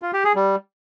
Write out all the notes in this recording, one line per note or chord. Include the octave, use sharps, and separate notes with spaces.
F4
G4
G#4
G3